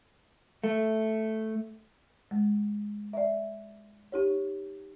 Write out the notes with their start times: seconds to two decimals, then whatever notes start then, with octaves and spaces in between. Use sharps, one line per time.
0.64 A3
2.31 G#3
3.13 D5 E5
4.12 D#4 G4 C#5